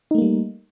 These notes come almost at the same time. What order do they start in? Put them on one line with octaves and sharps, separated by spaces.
D#4 A3 A#3 G3